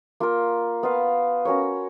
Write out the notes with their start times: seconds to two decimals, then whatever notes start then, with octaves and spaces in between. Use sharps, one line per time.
0.20 A#3 F4 A#4
0.83 B3 F4 B4 F5
1.45 C#4 F#4 A#4 C#5